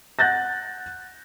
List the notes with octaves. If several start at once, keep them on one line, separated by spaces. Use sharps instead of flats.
F#5 F#6 G6 A6 A#6